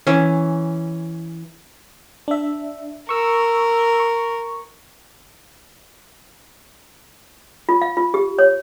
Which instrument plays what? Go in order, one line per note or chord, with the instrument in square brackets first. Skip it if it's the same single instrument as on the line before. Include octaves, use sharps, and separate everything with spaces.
[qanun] E3 C#4
[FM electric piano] D4 E5
[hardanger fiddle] A#4 [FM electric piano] C#6 E6
[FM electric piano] C#6
[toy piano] F4
F5
F4
G4
C#5